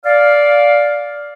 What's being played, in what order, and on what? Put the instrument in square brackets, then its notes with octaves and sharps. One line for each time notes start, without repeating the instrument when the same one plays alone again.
[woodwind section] D5 F5